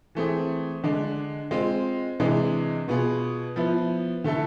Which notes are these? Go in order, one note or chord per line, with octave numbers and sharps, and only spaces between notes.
E3 A3 C4 G#4
D3 G#3 D4
G#3 C4 F4
C3 E3 G#3 D4 G#4
B2 B3 F4 G#4
F3 B3 E4
D3 A3 E4 A4